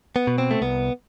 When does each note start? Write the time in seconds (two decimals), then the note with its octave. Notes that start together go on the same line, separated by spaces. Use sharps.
0.16 B3
0.27 B2
0.38 C4
0.51 A3
0.62 C2 B3